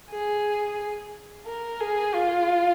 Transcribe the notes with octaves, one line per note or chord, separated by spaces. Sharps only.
G#4
A#4
G#4
F4